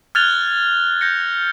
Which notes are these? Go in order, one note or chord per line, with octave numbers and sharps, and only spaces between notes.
F6 F#6 G#6 A6 F7 G7
G6 A#6 C#7